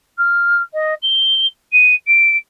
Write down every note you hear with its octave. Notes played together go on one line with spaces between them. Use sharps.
F6
D#5
G7
D#7
D7